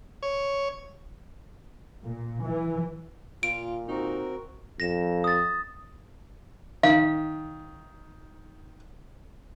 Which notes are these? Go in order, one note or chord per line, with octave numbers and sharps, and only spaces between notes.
C#5
A#2
E3
A#2 F4 D7
C4 D#4 F#4 A#4
F2 A#6 E7
D#6 A6
D#3 F5